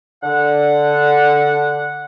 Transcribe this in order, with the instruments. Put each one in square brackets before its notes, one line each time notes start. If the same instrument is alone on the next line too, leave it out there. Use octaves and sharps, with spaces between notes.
[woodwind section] D3 F#5